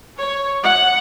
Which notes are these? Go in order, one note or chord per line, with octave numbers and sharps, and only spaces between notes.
C#5
F#5